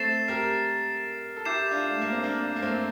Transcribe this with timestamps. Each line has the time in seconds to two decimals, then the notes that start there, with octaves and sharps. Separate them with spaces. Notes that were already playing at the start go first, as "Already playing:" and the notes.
Already playing: A3 C4 A6 C7 E7
0.28 G4 A#4
1.36 A4
1.45 E4 G4 D6 G6 C7 E7
1.71 D4 F4
1.90 A3
2.02 A#3
2.12 C4
2.23 A#3 D4
2.56 A#3
2.62 A3 C4